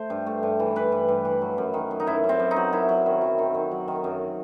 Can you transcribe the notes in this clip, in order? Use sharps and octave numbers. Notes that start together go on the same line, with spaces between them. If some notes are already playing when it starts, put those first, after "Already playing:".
Already playing: A3 C5
G2
A3
G2
E3
E3 B4
G2
G2
E3
F#3
F#2
D#3
F#2
D#4
F#2 E4
F#2
C4
F#2
D#4
F#3
F#2 E4
F#3
D#3
F#3
D#3
D#3
F#3
D#3
F#2